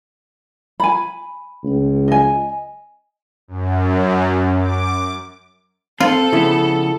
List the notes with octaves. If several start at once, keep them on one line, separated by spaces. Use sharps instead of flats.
G#5 B5
C#2
D#5 G#5
F#2
D6
C4 F4 A4
C#3 F3 B3 E4